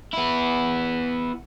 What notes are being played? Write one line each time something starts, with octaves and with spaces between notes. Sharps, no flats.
B3 E4